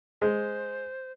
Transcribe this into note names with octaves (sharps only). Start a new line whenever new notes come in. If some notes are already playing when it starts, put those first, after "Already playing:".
G#3 C5